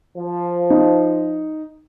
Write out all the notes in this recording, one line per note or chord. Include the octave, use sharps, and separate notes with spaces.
F3
D#4